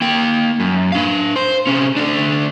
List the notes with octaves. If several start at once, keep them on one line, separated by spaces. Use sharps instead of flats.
A#3 G5
F#2
D4 F5
C5
C3 C#4
A3 D4